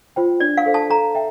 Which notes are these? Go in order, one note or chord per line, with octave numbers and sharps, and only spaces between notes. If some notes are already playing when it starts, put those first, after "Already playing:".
F4 C5 G5
D4 D5
F5
A4 C5
A5
A4 A#5
E5 G5